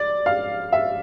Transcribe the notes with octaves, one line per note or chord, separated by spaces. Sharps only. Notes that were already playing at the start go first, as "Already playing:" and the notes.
Already playing: D5
F5
E5